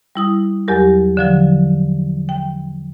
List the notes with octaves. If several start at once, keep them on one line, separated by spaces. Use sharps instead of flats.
G3 E4 D#6
E2 F#3 G4 A#4
D3 F3 F#3
G5